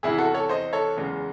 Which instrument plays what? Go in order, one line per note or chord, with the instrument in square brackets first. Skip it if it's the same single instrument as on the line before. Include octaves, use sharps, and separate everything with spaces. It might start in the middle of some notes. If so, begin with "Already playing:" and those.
[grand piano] E2 C3 E3 E4 G#4
F#4 A4
A4 C#5
C5 D#5
A4 C#5
F#1 E2 C#3 G#3